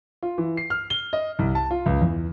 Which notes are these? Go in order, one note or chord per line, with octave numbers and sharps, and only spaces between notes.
F4
E3
C7
F6
G7
D#5
C2
A5
F4
C#2
E2